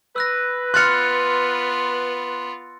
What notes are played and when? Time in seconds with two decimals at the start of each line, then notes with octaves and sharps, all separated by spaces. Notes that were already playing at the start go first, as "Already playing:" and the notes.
0.16 B4 E6 F#6 A#6
0.74 B3 F4 C6 F6 F#6 A6 C#7